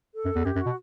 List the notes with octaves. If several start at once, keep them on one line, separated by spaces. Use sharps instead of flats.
A4
F#2
E2
F#2 G4
F#2
B2 F#4